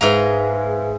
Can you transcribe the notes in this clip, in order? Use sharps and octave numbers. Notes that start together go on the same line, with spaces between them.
G#2 G#4 B4 E5 F5 A#5